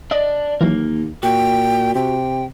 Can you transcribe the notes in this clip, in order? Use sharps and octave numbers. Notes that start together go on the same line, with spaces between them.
D4 D5 D#5
D#2 E3 F#3 A#3 A#4
A#2 F#4 G5
C3 G5